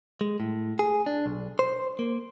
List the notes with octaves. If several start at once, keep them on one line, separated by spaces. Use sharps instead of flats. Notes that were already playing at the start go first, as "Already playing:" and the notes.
G#3
A2
G#4
D4
B1
C5
A#3